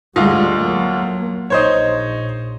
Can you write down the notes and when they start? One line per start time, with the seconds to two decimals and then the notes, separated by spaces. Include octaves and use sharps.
0.16 D2 G3 G#3 F4
0.62 F#3 A#3
1.50 A#1 D#4 C5 C#5